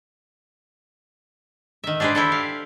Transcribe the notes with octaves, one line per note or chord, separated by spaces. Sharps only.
D#3 E5
D4 G4 G#4 B4 C5
E4 G4 A4
F5